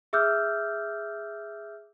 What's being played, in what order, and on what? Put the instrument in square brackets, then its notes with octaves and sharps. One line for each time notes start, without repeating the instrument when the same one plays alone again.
[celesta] G#4 E5 D6 E6 F6 G6